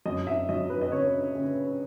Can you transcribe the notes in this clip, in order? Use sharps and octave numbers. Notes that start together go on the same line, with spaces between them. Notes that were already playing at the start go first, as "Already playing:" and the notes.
F#2 D#5
E5
F#3 D#5
B4
D#5
C#3 C#5
C#3